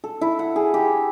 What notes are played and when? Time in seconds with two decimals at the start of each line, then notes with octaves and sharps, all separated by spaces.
0.04 A4
0.21 E4
0.39 F#5
0.56 G#4
0.74 G4